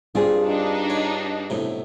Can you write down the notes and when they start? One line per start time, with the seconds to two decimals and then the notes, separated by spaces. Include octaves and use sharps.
0.15 G2 G3 C4 F4 G#4
0.47 D4 D#4
0.90 C#5
1.50 B1 A2 C3